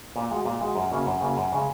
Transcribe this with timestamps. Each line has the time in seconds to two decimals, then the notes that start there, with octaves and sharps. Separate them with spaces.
0.16 A#2
0.31 G#3 F#4
0.45 A#2
0.61 G#3 F#4
0.76 F#2
0.91 C#3 A#3 C#4 F#4
1.06 F#2
1.21 C#3 A#3 C#4 F#4
1.37 F#2
1.52 C#3 G#3 C#4